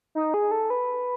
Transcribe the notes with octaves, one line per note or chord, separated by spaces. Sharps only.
D#4
G#4
A4
B4